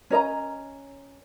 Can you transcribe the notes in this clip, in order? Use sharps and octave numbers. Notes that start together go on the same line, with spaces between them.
C#4 A#4 D#5 A#5